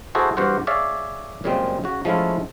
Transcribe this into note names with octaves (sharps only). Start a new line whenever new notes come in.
E4 F#4 G#4 A4 C5
E2 G2 F#4 C5 F#5
G#4 C#5 D5 E5 F5
F#2 A#2 C#3 G3 G#3 C4
C#3 F#4
F3 G#3 A3 C#4 E4 F4